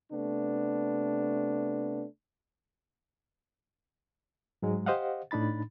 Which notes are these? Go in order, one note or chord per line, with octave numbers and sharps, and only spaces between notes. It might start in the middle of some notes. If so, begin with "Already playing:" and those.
C3 A3 B3 D4
G#2 F#3 G#3
G4 C5 D#5 F5 F#5
A2 D4 D#4 B5 A6